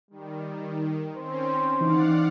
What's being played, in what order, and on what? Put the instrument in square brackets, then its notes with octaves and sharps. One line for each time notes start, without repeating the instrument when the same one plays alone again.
[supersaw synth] D#3 [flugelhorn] G3
[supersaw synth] C4 C#4 [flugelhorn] C5
[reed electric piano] E3 D#4 [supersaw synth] D5 F5 F#5